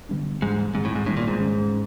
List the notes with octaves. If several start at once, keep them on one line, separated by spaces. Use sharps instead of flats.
D3 G3 B3 D4
G#2 E3 G3 B3 D4
G#2 D#3 G3 C4
A2
G#2
A2 D#3 G3 B3 D4
A#2
G#2
D#3 G#3 C#4